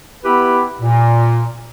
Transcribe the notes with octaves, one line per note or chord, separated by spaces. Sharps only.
B3 E4 G4 B4
A#2